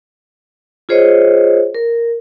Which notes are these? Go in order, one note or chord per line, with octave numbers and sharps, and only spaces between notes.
F4 G#4 C5 C#5 D#5
A#4